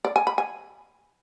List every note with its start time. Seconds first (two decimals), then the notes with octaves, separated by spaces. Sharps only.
0.05 D5
0.16 G#5
0.27 B5
0.38 G#5